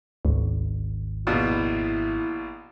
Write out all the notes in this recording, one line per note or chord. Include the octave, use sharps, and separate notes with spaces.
G#1 D2
A#1 B2 E4